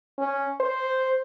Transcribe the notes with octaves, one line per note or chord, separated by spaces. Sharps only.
C#4
C5